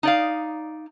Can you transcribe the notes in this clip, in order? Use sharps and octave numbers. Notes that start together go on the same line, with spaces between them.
D#4 D5 F5